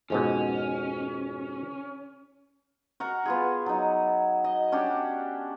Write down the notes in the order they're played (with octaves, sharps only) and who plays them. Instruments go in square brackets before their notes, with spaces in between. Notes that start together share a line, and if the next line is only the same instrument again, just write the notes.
[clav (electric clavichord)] F2 G#2 B2 [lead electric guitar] C#4
[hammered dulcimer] F#4 A#4 A#5
B3 F4 G#4
F#3 D#4
D#5
C#4 D4 F#4 G4